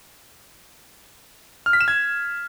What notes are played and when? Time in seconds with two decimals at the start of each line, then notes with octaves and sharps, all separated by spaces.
1.66 F6
1.73 B6
1.81 E7
1.88 G#6